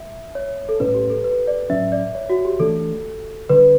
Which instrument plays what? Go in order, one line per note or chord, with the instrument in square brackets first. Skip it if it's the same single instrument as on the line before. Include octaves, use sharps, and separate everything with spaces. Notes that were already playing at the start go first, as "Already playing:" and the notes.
Already playing: [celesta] E5
C#5
A4
[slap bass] A2 G3 C#4 [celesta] B4
[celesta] G4
A4
B4
D5
[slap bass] A2 F#3 C#4 [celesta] E5
[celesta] D5
C#5
F#4
G4
[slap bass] E3 A3 D4 [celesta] A4
[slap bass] D3 G3 D4 [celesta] B4